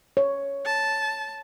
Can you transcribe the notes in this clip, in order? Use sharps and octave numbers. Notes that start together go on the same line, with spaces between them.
C#5
A5